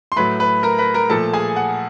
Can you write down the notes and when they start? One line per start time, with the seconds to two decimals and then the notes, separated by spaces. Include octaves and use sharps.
0.12 C6
0.16 A2 F#3 A3 B4 B5
0.40 B4 B5
0.63 A#4 A#5
0.78 B4 B5
0.94 A#4 A#5
1.10 A#2 F3 A3 A4 A5
1.33 G#4 G#5
1.56 F#5